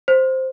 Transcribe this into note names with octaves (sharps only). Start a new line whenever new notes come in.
C5